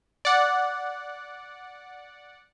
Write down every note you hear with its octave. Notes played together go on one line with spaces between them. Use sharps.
D5 F#5